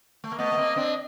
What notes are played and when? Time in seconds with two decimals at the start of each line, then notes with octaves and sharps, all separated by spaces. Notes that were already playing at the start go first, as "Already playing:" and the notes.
0.24 A3
0.32 A#3
0.39 A3 B3 D#5
0.52 B3
0.57 A#3 C4
0.76 C4 D4